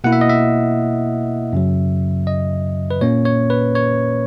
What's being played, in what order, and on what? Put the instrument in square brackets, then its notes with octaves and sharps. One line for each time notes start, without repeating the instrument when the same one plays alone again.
[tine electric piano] B2 A#3 E4 F#5
E5
D#5
E5
F#2 C#3 F#3
D#5
B4
A#2 A#3 C#4 C#5
C#5
B4
C#5